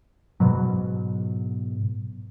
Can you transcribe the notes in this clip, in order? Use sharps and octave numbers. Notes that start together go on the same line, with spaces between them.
G#2 B2 F#3